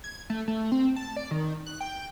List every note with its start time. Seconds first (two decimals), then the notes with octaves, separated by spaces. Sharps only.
0.04 G#6
0.30 A3
0.48 A3
0.72 C4
0.96 A5
1.16 D5
1.31 D#3
1.67 F#6
1.81 G5